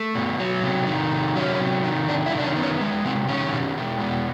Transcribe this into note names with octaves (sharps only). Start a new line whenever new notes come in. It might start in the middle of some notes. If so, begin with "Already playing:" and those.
Already playing: A3
B2
F#3
C3
D#3
C3
F#3 C#4
C3
D#3
C3 D4
E4
D#3
D4
C#4
B3
C#4
G#3
C3 C4
D#3 C#4
B2
G#3
B2